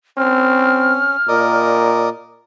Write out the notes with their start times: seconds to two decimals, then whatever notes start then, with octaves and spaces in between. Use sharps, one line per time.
0.17 C4 C#4 F6
1.28 A#2 A#4 D5 D#5